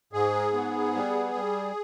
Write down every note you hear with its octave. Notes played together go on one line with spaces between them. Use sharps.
G#2 G#4
B3
G3
G3